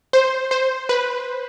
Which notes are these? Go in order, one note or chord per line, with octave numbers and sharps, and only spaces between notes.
C5
C5
B4